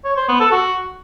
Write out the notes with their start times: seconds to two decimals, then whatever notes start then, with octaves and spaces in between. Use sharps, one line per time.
0.05 C#5
0.17 C5
0.28 B3
0.40 A4
0.52 F#4